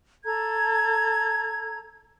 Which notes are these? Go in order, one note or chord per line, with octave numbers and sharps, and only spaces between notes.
A4 A#5 G#6